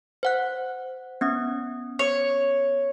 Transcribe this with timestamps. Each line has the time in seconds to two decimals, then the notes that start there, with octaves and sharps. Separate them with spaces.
0.23 C5 F#5 F#6
1.21 B3 C#4 D#6
1.99 C#5